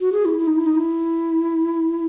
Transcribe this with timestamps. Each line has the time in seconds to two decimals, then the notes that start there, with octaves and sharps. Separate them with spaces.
0.01 F#4
0.13 G#4
0.25 E4
0.38 E4
0.47 D#4
0.56 E4
0.66 D#4
0.76 E4